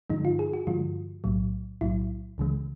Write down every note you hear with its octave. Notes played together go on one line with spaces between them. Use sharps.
G2 D3 F3 G#3 D#4
F4
G#4
F#4
G2 D3 F3 G#3 F4
B1 A2 F#3
B1 A2 F#3 E4
C#2 C#3 E3 G#3